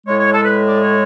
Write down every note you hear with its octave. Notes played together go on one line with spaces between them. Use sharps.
A2 G#3 C#5
C#5
A4
B4
D5
C#5